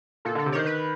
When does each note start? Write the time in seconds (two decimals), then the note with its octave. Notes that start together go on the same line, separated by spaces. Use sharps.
0.25 A#2 A4
0.35 D3 A4
0.46 C3
0.52 C#5
0.55 D#3 C5
0.66 B4